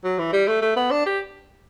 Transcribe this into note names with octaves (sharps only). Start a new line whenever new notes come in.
F#3
E3
G3
A3
A3
B3
D4
G4